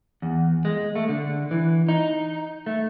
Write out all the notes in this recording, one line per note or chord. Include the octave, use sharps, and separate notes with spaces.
E2
G#3
A3
D3
E3
D#4
A3